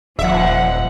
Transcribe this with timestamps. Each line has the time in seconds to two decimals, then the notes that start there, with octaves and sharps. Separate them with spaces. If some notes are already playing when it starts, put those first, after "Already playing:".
0.19 D#1 F3 E5 F#5